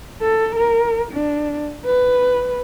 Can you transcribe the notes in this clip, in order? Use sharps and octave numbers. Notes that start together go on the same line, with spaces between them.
A4
A#4
D4
B4